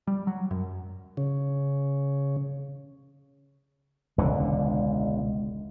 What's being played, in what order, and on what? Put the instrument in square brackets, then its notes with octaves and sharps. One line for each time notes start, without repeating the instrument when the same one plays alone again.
[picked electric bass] G3
F#3
F#2
[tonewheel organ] C#3
[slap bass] E1 C#2 D3 G#3